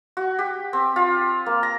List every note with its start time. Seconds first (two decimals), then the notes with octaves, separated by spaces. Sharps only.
0.17 F#4
0.39 G4
0.73 C4
0.96 F4
1.46 A#3
1.63 A#5